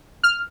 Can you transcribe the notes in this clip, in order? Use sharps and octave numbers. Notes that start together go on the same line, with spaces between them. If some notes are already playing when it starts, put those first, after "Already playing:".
F6